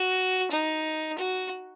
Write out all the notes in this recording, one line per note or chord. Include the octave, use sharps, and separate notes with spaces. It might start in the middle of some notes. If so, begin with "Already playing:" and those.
Already playing: F#4
D#4
F#4